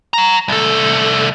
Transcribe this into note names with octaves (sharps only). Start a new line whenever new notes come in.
F#5 A#5
C2 A4